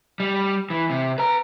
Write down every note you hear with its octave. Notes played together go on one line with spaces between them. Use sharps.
G3
E3
C3
B4 A#5